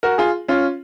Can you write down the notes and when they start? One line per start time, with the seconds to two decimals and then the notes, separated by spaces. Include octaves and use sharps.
0.03 F#4 A#4
0.18 F4 G#4
0.48 C#4 F4